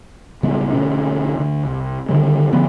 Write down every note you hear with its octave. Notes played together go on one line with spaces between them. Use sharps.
D1 C#2 B2 G3
D2 B2 C#4
D2
C2
D3 D#3 G3
D3 F3 B3